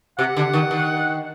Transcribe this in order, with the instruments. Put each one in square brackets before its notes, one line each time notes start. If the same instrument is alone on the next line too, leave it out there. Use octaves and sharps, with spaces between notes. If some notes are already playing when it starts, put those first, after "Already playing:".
[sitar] C3 [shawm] F#5
[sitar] D3
D#3
D#3